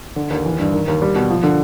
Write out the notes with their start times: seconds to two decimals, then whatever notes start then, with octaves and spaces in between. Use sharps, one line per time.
0.16 D3
0.30 D#2
0.45 E3
0.60 G2
0.73 D#3
0.88 D#2
1.02 G3
1.15 B2
1.30 F3
1.43 D3